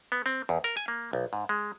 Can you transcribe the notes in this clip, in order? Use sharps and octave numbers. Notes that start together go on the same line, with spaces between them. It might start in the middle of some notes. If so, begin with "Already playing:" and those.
B3
C4
E2
A#4
G#5
A#3
B1
G#2
G#3